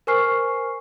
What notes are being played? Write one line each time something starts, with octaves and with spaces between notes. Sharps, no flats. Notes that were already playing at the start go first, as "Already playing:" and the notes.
A#4 C5 G#5 C#6 F6 C7